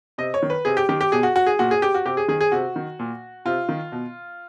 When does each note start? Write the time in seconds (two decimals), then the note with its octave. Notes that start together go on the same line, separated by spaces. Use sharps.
0.18 C3 D#5
0.34 C#5
0.42 D#3
0.50 B4
0.65 C3 G#4
0.77 G4
0.89 D#3 G4
1.01 G4
1.12 B2 G#4
1.23 F#4
1.36 F#4
1.46 G#4
1.59 A#2 F#4
1.71 G#4
1.82 G4
1.94 F#4
2.05 C3 G4
2.17 G#4
2.28 D#3 G#4
2.41 G#4
2.52 C3 F#4
2.76 D#3
2.99 A#2
3.45 C3 F4
3.69 D#3
3.92 B2